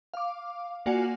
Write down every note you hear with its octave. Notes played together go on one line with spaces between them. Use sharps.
F5 D6
A#3 F4 F#4 D5 F#5 G#5